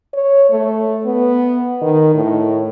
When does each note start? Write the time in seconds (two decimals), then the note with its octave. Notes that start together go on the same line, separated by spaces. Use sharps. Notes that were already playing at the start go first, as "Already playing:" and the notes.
0.13 C#5
0.51 A3
1.05 B3
1.81 D#3
2.14 A2